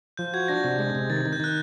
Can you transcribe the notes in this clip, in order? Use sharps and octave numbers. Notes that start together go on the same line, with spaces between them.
F3 G6
F#4 G#6
D4 A#6
C3
G#3
C3
D#3 A6
D#3
G6
D#3 F#6